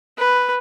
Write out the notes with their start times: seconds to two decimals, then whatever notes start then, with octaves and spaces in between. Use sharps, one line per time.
0.18 B4